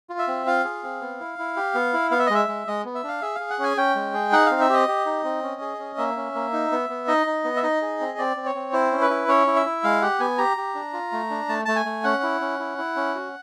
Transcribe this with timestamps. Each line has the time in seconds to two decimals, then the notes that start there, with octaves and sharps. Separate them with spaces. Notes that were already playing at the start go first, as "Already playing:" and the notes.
0.10 F4
0.19 E5
0.28 C4
0.47 F4 F5
0.64 G#4
0.83 C4
1.01 B3
1.20 E4
1.39 E4
1.57 G4
1.75 B3
1.94 E4
2.11 B3 F5
2.19 E5
2.27 D#5
2.30 G#3 E5
2.48 G#3
2.67 G#3 D#5
2.85 B3
2.95 E5
3.04 D4 F5
3.21 G#4 E5
3.35 G#4 F5
3.50 F#5
3.59 C#4 G#5
3.77 C#4 G5
3.95 G#3
4.14 G#4
4.32 D#4 F#5
4.46 C4 F5
4.60 E5
4.69 G4 D#5
4.88 G4
5.06 D#4
5.24 C4
5.43 C#4
5.61 G#4
5.79 C#4
5.98 A#3 E5
6.16 C#4
6.35 A#3
6.53 D#4
6.72 B3
6.89 B3
7.07 D#4 D#5
7.26 D#4
7.44 B3
7.56 E5
7.63 D#4 D#5
7.82 G#4
8.00 C4
8.18 C4 D5
8.37 C4
8.46 C#5
8.55 C4
8.73 E4 C5
8.92 C#4
9.01 B4
9.10 E4
9.28 C#4 C#5
9.47 E4
9.56 E5
9.66 E4
9.84 G#3 F5
10.02 G4 F#5
10.20 B3 G#5
10.38 G4 A#5
10.57 G4
10.75 D4
10.93 F4
11.12 A3
11.31 D4
11.49 A3 A5
11.65 A3 A5
11.76 G#5
11.85 A3
12.04 C#4 F#5
12.23 E4
12.41 C#4
12.59 E4
12.78 E4
12.96 C#4
13.14 F#4